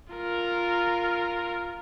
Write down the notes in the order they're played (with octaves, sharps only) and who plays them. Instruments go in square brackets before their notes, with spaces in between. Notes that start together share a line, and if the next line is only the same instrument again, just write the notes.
[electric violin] F4 A#4